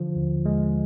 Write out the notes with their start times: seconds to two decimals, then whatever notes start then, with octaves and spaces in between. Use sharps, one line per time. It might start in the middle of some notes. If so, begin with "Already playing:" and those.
Already playing: D3 F3
0.16 D#2
0.46 G#3